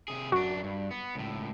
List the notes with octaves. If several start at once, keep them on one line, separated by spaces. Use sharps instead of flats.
C3 G#4
F#2 D4 F#4
G2
B3
C#2 A2